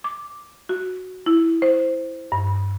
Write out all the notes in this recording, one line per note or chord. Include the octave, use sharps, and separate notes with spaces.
D6
F#4
E4
C5
G2